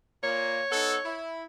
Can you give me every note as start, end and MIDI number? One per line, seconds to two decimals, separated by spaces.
0.23 0.62 46
0.23 0.62 58
0.23 1.22 73
0.71 0.98 59
0.71 0.98 63
0.71 0.98 69
1.05 1.45 64